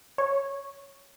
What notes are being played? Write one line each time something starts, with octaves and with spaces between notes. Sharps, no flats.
C#5